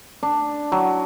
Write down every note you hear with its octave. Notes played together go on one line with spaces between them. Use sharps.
D4
F#3